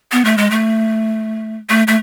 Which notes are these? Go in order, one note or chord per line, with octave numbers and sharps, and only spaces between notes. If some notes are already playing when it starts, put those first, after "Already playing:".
B3
A3
G#3
A3
A3
A3